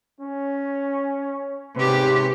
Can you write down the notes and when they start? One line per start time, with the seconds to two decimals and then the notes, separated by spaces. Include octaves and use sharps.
0.20 C#4
1.76 G#2 C3 C#4 G4 B4